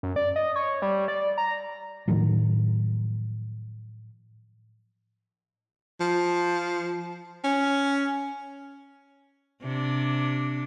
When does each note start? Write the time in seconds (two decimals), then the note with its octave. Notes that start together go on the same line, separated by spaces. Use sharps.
0.03 F#2
0.16 D5
0.36 D#5
0.56 C#5
0.82 G3
1.08 D5
1.38 A#5
2.08 A2 D#3 F3 F#3
6.00 F3
7.44 C#4
9.62 C3 D4